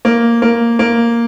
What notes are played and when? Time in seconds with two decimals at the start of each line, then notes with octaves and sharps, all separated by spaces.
0.05 A#3
0.42 A#3
0.79 A#3